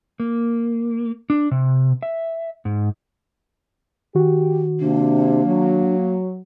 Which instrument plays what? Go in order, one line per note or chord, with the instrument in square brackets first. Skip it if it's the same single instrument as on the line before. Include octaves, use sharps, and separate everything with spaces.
[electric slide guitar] A#3
D4
C3
E5
G#2
[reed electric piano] D#3 F#4 [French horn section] G4
[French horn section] C3 [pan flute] A#3 [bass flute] D4
[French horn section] F#3